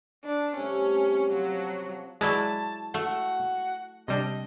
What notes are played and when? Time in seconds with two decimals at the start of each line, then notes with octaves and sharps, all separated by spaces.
0.24 D4 B4
0.57 C3 G3 A3 C#4
1.33 F3 F#3
2.21 F#3 G#3 E4 D5 A5
2.94 A3 F#4
4.08 C3 G3 D4 D#5